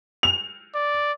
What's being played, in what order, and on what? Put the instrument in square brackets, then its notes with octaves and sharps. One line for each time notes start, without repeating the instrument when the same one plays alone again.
[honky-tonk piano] F7
[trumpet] D5